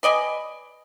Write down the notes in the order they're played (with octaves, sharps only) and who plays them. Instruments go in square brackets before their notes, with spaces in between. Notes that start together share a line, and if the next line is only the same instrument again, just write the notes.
[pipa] B4 D5 D#5 G#5